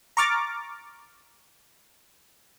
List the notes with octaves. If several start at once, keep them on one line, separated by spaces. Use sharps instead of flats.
A#5 C#6 D6 F6 A6